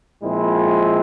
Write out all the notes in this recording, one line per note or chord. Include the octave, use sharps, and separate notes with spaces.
A#2 F3 G#3 C4 E4